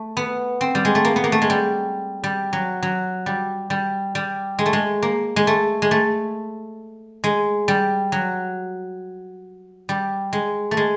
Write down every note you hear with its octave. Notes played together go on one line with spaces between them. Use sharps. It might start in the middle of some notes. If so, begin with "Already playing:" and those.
Already playing: A3
B3
C4
G3
G#3
A3
A#3
B3
A#3
A3
G#3
G3
G3
F#3
F#3
G3
G3
G3
G#3
A3
G#3
A#3
G#3
A3
G#3
A3
G#3
G3
F#3
G3
G#3
A3
G#3